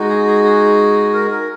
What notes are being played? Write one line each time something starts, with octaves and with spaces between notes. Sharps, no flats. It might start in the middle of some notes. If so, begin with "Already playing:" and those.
Already playing: G#3 D#4 F#4
G#4
G#4
G#4
A#4
A#4